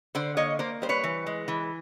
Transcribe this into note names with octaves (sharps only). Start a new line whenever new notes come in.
D3 C5 D5
A#3 C#5 D#5
A#3 C5 D5
G3 C5
B4 C#5
E3
G#3
E3